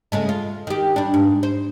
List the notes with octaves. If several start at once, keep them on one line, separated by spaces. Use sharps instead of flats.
C#3 G#3 A3
F4
D#3 G4
G3 D4
G#2
C5